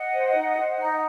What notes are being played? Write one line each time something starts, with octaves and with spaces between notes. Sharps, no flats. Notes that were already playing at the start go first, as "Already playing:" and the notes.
Already playing: D#5 F#5
C5
D#4
C5
D#4